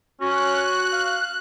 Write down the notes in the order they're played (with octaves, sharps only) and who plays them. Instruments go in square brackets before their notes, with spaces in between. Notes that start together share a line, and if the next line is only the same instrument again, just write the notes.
[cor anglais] C#4 [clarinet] F#4 [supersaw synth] F#6
[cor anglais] F5